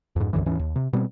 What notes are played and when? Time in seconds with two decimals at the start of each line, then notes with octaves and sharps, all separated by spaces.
0.16 F2 G#2
0.33 C2 F#2 D3 E3
0.46 D#2 G#2 E3 C#4
0.59 D#2
0.76 C3
0.93 B2 G3 C4